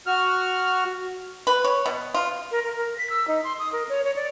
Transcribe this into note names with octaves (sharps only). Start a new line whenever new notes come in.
F#4 F6
B4
C#5
B2
F4
A#4
A#4
A#4
B6
E6
D#4
C6
D#6
A#4
C#5
C#5
D5